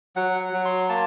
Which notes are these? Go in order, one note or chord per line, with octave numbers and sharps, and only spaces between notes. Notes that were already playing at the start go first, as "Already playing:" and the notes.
F#3 F#5
F#5
F#3
C6
A#3 A5